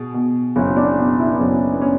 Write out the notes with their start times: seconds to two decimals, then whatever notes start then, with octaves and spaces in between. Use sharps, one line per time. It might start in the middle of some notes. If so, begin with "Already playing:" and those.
Already playing: B2 G#4
0.14 B2
0.56 F#1 C#4
0.77 D4
0.98 B2
1.19 E4
1.32 B3
1.40 F#1 C#4
1.74 B3
1.81 C#4